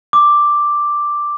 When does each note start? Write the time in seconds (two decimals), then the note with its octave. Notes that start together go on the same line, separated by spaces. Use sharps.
0.13 D6